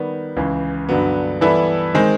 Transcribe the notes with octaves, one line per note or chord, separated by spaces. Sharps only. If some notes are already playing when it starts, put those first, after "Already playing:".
Already playing: D#3 G3 B3
C#2 C#3 E3
G2 D3 F#3 B3
E3 G3 B3 E4 A4
D#3 G#3 C4